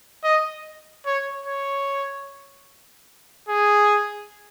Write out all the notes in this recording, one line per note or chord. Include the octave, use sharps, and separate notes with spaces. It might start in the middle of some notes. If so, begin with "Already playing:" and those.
D#5
C#5
C#5
G#4